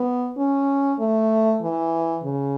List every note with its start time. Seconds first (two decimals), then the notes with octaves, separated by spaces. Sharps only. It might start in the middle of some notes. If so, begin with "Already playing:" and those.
Already playing: B3
0.37 C#4
0.99 A3
1.62 E3
2.23 C#3